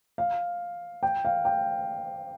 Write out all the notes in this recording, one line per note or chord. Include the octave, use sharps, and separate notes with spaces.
F5
G5
F5
G5